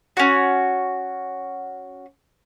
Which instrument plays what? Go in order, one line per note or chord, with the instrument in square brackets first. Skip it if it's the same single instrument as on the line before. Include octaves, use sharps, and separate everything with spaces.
[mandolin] C#4 F#4